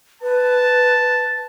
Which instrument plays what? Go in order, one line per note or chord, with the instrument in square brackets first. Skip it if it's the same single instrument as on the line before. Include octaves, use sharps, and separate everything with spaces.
[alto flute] B4 [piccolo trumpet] A5